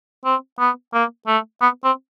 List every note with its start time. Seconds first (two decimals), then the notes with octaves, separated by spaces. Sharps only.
0.25 C4
0.59 B3
0.93 A#3
1.27 A3
1.61 B3
1.84 C4